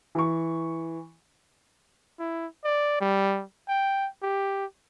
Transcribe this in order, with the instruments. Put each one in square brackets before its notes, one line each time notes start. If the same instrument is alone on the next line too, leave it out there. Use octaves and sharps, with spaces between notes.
[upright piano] E3 C#6
[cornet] E4
D5
G3
G5
G4